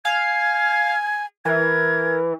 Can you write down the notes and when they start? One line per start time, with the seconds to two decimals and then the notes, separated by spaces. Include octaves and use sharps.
0.05 F5 G#5 G#6
1.45 E3 A#4 G#6